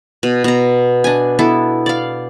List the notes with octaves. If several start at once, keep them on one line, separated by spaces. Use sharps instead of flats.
B2
B2 A#5
D4 G#5
B3 E4 A4
D5 F5